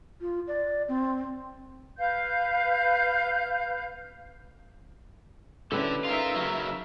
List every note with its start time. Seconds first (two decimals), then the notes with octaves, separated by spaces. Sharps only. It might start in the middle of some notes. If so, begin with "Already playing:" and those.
0.21 F4
0.48 D5
0.88 C4
1.98 B4 F5 G6
5.72 D3 G3 C#4 E4 A4 B4
6.05 D#4 F4 A#4 E5
6.36 C#3 F#3